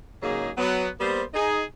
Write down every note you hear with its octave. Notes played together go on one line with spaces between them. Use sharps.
G#2 C#3 F#3 A#3 D#4 G#4
F#3 B3
G3 A#3 B3 C5
D#4 G#4